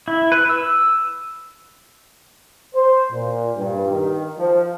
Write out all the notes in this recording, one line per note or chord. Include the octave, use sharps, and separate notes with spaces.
E4
B4
E6
C5
A#2
G2
D#3
F3